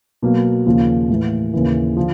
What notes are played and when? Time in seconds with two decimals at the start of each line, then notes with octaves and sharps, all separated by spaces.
0.22 B2 F#3 A#3
0.66 D#2 C#3 F3 A#3
1.09 A2 E3 A3
1.54 D#2 C#3 E3
1.97 D3 F3